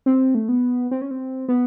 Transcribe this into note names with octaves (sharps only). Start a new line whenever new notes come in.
C4
A3
B3
C4
C#4
C4
B3